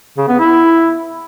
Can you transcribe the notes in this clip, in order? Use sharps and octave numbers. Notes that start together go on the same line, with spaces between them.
C#3
B3
E4